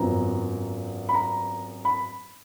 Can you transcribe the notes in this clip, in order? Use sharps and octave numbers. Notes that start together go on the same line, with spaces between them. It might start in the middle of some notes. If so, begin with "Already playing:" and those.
Already playing: G#1 F#2 F3 B3 A#5
B5
A#5
B5